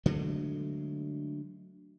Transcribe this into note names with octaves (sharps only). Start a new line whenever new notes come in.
D3 F#3 G#3 A3